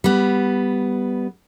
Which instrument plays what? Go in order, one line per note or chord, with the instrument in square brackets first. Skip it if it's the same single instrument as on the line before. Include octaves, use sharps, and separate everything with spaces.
[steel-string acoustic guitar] G3 B3